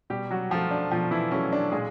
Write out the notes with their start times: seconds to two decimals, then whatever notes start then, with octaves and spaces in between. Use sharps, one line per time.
0.10 B2 G3 G4
0.31 F#3 F#4
0.50 F3 F#3 A3 F4
0.71 D4
0.91 B2 F3 F4
1.11 E3 E4
1.31 F#3 A3 C#4
1.53 D4
1.72 A#2 G#3 G#4